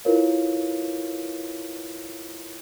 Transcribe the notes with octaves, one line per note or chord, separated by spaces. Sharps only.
E4 F4 A#4 B4 C#5 F5